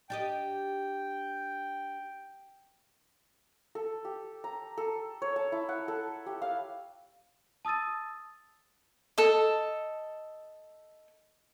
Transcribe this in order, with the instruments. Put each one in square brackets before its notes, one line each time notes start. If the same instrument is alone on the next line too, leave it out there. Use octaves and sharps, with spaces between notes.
[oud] D4 G4 D#5 [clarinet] G5
[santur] A4
G4
A#5
A4
C#5
A5
E4
F#5
A4
G4
F5
[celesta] A5 D#6 E6 A6 D#7
[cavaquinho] A4 D#5